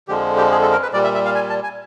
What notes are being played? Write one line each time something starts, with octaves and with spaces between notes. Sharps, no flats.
F2 D3 F3 G#3 G4
G4
G#4
A4
A#4
B4
A#2 G3 D5
E5
E5
F5
G#5
A5
G#5